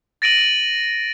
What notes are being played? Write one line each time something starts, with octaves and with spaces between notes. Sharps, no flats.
A6 A#6 D7 D#7 F#7